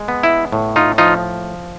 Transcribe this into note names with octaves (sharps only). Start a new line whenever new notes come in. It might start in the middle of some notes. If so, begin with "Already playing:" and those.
Already playing: G#3
B3
E4
A2
D#4 F4
F3 D#4 F4